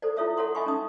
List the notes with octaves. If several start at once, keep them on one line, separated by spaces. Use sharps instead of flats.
A4 C5 D5
E4 F4 A4 C#5 E5 D#6
A4 C#5 F#5 C6 D#6
D#5 E5 G#5 B5 C#6
C#4 D#4 D#6